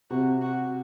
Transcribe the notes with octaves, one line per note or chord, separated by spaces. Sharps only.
C3 F#4
F#4